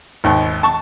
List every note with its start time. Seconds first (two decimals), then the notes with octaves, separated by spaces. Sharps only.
0.24 G#1 D#2
0.63 A5 C#6